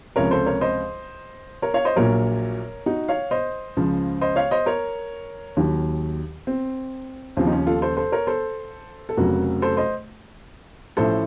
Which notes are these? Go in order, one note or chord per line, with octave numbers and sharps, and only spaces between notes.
C#2 C3 F3 A#4 C#5
A4 C5
A#4 C#5
C5 D#5
A#4 C#5
C#5 F5
C5 D#5
A#1 A#2 F#3 A#4 C#5
D#4 F#4
C#5 F5
C5 D#5
C#2 C#3 F3
C5 D#5
C#5 F5
C5 D#5
A#4 C#5
D#2 D#3 F#3
C4
D#2 C#3 F3 C4
D#4
C#4
F4 A4
A4 C5
A4 C5
A#4 C#5
A4 C5
A4
F1 F2 C#3 F#3 F#4 A#4
A4 C5
C5 D#5
A1 A2 F3 A4 C5